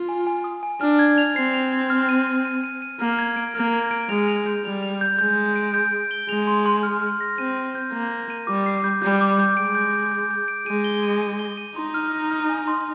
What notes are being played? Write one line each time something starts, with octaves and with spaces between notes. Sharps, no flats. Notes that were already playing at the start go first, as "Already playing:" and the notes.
Already playing: F4
G#5
G#5
D#6
G#5
D4 F6
G#6
F7
C4 C7
F7
G#6
F6
D#7
D#7
D#7
D#7
D#7
A#3 F6
G#6
D7
A#3 F6
G#6
D7
G#3 F7
F7
G6
G3 F7
F7
G6
G#3 G6
G6
D7
G6
D7
G7
G#3 F7
C6
C6
F6
F6
A#6
C4 D#7
D#7
G6
A#3 G6
A#6
D#7
G3 D6
C7
G6
G3 G6
D6
G6
G#3 D7
G6
G6
G6
G6
D7
G#3 D#7
G7
D#7
D#7
G7
D#7
D#4 C6
F6
F6
F6
G#5
C6